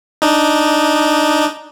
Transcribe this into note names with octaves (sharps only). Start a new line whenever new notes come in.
D4 D#4